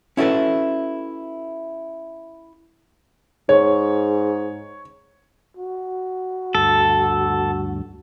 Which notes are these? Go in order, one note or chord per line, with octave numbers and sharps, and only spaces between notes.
C#4 E4 F#4 A4 B4
G#2 C#5
F#4
D2 G2 A4